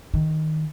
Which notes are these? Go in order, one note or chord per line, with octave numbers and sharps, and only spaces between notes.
D#3